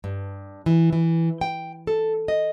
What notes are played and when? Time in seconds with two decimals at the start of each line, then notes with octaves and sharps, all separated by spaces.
0.04 G2
0.66 E3
0.93 E3
1.41 G5
1.87 A4
2.28 D#5